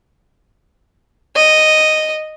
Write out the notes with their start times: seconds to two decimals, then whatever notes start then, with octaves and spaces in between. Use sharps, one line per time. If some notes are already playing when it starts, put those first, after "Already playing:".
1.36 D#5